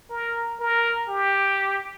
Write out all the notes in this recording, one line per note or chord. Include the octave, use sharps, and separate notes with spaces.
A#4
A#4
G4